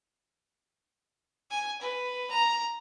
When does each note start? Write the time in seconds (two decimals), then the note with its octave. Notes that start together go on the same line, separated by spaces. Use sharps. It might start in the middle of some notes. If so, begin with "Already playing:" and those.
1.51 G#5
1.81 B4
2.31 A#5